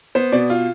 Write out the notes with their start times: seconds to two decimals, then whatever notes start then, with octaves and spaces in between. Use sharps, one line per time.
0.15 B3 C5
0.32 B2 D5
0.50 F4